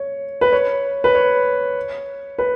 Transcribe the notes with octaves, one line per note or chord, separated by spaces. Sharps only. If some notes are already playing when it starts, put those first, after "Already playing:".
Already playing: C#5
B4
C#5
B4
C#5
B4